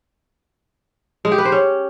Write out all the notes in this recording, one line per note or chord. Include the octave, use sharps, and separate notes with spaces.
G#3
G4
B4
C5
C#4